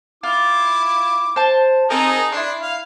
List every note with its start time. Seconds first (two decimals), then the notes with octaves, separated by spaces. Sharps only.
0.23 E4 F4 D6
1.36 C5 A5
1.90 C4 D#4 G#4 A#4 A5
2.32 D4 E4 C6
2.61 F5